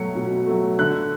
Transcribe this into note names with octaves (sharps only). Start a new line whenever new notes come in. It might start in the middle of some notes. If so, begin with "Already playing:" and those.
Already playing: B2 F#3 A3 C#7
B2
F#3 A3
D3 F#6